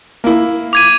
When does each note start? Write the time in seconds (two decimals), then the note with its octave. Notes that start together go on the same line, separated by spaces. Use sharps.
0.24 A#3 E4
0.73 D6 G#6 D#7